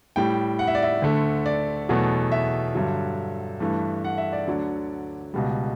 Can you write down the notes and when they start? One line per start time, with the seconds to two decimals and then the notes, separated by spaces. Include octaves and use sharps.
0.16 A2 G3 G5
0.59 F#5
0.67 E5
0.75 D5
0.82 E5
1.02 D2 D3 A3
1.46 D5
1.89 E2 B2 F#3 A3
2.32 E5
2.75 G2 D3 F#3
3.60 G2 E3 A3
4.05 F#5
4.18 E5
4.33 D5
4.47 D2 D3 F#3
5.34 C#2 B2 G3